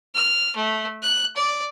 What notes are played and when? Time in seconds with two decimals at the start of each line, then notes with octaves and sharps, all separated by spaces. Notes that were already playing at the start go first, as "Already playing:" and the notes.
0.15 F6
0.56 A3
1.02 F#6
1.36 D5